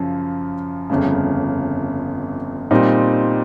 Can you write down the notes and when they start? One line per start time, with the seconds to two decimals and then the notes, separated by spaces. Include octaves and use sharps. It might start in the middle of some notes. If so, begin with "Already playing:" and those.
Already playing: F#2 C#3 F3
0.90 G1 F2 C#3
2.71 A#2 G3 C4 D#4